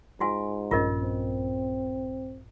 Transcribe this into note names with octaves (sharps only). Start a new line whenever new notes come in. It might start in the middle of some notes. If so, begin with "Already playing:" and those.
G#2 F4 F#4 G#5
A#1 G2 C#4 F4 A#4 D#5
C4